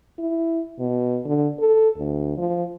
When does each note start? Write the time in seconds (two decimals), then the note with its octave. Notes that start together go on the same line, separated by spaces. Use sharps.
0.18 E4
0.79 B2
1.25 D3
1.60 A4
1.97 D2
2.37 F3